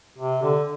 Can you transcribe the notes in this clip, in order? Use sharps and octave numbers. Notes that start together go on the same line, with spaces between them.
C3
D3